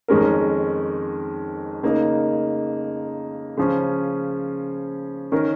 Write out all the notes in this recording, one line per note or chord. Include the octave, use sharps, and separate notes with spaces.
F2 D#3 G#3 C#4 A#4
C#3 A#3 D#4 A#4
C#3 F3 C#4
D#3 C#4 A#4